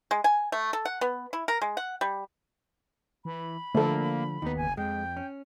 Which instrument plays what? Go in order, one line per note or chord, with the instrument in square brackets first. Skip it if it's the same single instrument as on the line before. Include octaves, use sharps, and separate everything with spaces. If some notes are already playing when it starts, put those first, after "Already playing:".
[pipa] G#3
G#5
A3
A4
F#5
B3
E4
A#4
G#3
F#5
G3
[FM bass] E3 [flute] B5
[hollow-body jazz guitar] D3 F3 D4 [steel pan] A3 A4 [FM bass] A#3
[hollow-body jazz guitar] D#2 B3 [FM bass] D#4
[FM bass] F#1 [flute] G#5
[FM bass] F2 [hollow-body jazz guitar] G#3 [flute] G5
[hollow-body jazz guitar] C#4